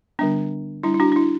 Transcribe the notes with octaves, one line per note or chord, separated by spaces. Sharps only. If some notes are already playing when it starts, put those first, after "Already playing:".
D3 G3 B3 D4
G3 D4 E4
E4
D4 F#4
D4
E4